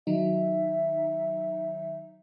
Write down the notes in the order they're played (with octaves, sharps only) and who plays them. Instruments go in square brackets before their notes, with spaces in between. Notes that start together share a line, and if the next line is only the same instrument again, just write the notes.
[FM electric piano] D#3 F#3 D#4 [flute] E5